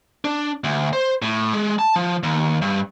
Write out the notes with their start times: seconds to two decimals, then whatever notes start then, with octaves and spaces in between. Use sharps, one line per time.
0.25 D4
0.64 D2
0.93 C5
1.22 A2
1.53 G#3
1.79 A5
1.96 F3
2.23 D#2
2.62 G2